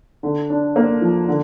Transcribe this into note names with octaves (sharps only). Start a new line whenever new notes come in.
D3
D4
A#3
F3
D3